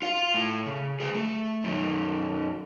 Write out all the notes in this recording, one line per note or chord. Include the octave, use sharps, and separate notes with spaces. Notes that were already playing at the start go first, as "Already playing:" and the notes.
F4 F5
A2
C#3
D2 G#4
A3
F#2 D#3